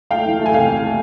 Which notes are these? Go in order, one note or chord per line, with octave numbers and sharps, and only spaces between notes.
A3 F5 G5
E3
A3
G#5
C2 F5 G5
A3
A3